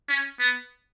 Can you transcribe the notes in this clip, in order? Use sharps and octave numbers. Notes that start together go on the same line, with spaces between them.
C#4
B3